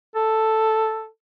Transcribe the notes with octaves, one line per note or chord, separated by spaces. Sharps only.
A4